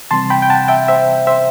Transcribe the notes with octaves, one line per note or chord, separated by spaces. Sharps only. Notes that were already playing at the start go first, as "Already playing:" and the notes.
C3 E3 G3 C4 A5 C6
G5 B5
G5
F#5 A5
E5 G5
C5 E5
C5 E5